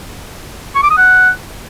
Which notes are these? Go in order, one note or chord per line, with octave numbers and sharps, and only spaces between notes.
C#6
D6
D#6
F#5